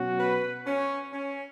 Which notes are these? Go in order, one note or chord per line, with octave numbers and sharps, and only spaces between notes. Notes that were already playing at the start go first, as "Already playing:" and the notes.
Already playing: B2 F#3 C#4 F#4
B4
C#4
C#4